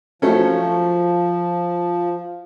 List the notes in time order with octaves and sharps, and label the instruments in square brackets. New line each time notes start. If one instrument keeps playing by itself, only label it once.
[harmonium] F3 [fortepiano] F#3 A3 C#4